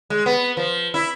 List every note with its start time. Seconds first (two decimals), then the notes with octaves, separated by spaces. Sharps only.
0.10 G#3
0.26 B3
0.57 F3
0.94 E4